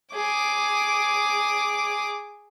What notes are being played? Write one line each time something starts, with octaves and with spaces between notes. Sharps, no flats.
G#4 D6